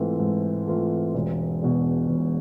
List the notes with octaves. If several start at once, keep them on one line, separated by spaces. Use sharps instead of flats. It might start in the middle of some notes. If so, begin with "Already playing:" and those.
Already playing: G#2 E3 A3 C4 F4
G#2
E3 A3 C4 F4
E1
E2 B2
E1